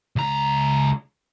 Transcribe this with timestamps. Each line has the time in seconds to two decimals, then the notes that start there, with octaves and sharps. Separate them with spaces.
0.16 C#2 A#5